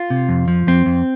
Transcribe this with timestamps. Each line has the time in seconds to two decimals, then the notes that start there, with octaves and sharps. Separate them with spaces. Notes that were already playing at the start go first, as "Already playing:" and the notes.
Already playing: F4
0.10 C3
0.29 F2
0.48 F3
0.67 F2 C4
0.86 F2